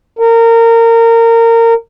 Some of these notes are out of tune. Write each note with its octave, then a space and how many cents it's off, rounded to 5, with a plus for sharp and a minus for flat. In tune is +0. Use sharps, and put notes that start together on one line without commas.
A#4 -25